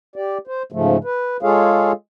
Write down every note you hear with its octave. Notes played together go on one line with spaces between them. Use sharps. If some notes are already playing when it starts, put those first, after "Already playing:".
G4 D5
C5
G#2 C#3 F3 A3
B4
G#3 F4 G#4 A4 C#5 F5